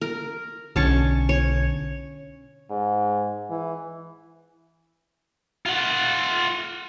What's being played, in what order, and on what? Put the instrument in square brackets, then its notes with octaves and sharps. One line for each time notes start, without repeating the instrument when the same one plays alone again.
[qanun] A#4
[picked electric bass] B1 D3 [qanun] C#4 A5 C#6
[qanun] C#5
[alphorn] G#2
E3
[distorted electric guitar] F4 F#5